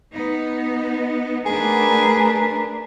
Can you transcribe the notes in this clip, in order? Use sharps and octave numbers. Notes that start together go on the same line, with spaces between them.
B3 D#4
A3 D4 G#4 A#4 B4